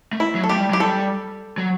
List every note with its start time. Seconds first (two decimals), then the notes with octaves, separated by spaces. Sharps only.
0.13 A3
0.20 E4
0.35 F#3
0.44 A4
0.49 A3 G4
0.58 G3
0.71 F#3 G4
0.80 G3 A4
1.58 F#3